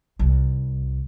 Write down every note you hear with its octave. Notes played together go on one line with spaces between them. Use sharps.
C2